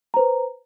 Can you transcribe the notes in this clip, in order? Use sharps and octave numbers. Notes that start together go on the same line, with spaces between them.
B4 C5 A#5